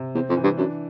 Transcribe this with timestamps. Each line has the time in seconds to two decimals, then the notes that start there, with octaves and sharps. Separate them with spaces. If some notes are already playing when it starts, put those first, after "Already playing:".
Already playing: C3
0.15 E2 C4
0.29 F2
0.37 E3
0.44 G2
0.58 F#2 D4